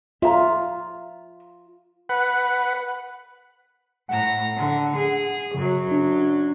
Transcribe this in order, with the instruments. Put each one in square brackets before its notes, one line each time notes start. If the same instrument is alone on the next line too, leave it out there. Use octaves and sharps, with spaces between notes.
[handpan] F4 [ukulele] E5 A#5
[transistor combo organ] B4 F#5
[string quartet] A2 A#5 [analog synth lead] F#5
[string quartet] D3
G#4
[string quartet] F#2 F#3 [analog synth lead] C#3
[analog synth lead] D4